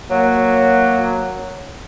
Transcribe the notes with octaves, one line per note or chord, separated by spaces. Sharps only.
F#3 A#3